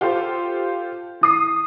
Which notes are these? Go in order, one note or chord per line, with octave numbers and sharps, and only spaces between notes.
F4 G4 A4 C5
E3 D#6 C7